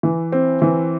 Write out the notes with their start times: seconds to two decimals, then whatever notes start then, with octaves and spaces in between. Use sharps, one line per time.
0.03 E3
0.32 C4
0.62 E3